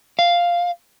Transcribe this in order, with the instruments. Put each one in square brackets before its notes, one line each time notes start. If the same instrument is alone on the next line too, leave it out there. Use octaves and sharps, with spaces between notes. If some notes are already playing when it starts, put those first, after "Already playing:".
[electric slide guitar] F5